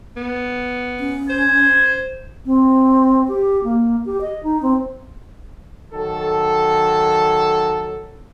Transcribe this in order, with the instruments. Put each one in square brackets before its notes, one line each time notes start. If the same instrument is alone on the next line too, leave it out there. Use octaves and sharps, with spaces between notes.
[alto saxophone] B3
[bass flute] C#4
[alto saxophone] C5 [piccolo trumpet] G#6
[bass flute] C4
G4
A#3
G4
D#5
D#4
C4
[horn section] D#3 F#3 A4